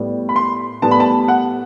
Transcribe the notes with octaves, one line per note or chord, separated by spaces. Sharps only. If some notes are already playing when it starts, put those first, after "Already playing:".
Already playing: A2 G3 B3
B5
C6
A2 G3 B3 A5
B5
A5
F#5